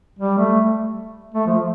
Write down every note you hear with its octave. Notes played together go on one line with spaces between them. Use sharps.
G3
A3
A3
F3